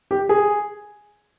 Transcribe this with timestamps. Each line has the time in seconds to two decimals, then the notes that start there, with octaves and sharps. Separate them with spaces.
0.11 G4
0.29 G#4